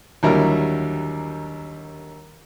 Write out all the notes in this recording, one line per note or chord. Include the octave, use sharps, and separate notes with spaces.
D#2 D3 F#3 G3 E4 A#4